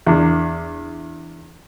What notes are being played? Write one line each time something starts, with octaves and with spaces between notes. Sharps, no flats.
E2 D4